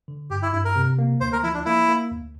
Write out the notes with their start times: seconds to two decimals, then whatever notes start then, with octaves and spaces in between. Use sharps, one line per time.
0.08 D3
0.30 G2 G4
0.42 E4
0.53 G2 E4
0.65 A#4
0.76 C3
0.98 A#3
1.21 D2 C5
1.33 A#4
1.43 F3 E4
1.54 D4
1.65 A#3 E4
1.89 A#3
2.11 D2